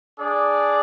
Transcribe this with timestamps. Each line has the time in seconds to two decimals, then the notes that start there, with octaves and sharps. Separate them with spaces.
0.20 D4 G#4 D5